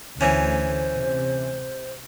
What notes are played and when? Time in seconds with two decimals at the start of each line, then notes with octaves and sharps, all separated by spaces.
0.21 D2 E3 C#4 C5
0.95 C3